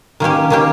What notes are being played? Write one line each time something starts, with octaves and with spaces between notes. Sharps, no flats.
D#3 A#3 C#4 G4
D#3 A#3 C#4 G4